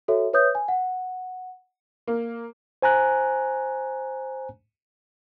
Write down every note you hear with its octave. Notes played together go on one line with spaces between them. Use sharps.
F#4 A4 C#5 E5
B4 C#5 E5 D#6 G6
G#5
F#5
A#3
C5 G#5 A#5 F#6